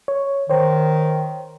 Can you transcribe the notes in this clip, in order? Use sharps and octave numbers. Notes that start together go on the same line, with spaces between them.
C#5
D#3 C5 C#5